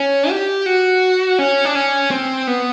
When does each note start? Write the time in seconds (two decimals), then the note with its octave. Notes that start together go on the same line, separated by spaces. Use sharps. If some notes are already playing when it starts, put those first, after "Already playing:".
Already playing: C#4
0.30 G4
0.66 F#4
1.39 C#4
1.65 D4
1.75 C#4
2.11 C4
2.47 B3